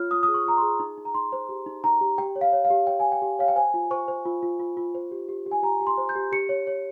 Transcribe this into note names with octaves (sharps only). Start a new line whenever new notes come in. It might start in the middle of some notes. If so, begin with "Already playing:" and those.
Already playing: F4 C#5 F6
F4 D#6
D#6
G#4
C#6
F4 A#5
C6
G#4
D#4
D#4
A#5
D#4 C6
C5
G4
D#4
D#4 A#5
G4
G4 G5
C#5
F5
C#5
F5
G4
C#5 G5
G#5
C#5
G5
G4
C#5 F5
G5
C5 G#5
F4
C5 C#6
C5
F4
F4
F4
F4
C5
G4
G4
G4
G#5
G4 A#5
G4
C6
C5
G6
G4
G4 C#7
C#5
C#5